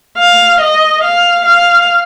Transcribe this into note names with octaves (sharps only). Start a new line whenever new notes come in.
F5
D#5
F5
F5